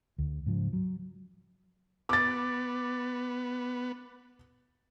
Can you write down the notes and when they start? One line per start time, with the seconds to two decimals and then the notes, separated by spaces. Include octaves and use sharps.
0.18 D2
0.46 G#2 C#3 F3
0.73 F#3
2.09 B3 D6 A6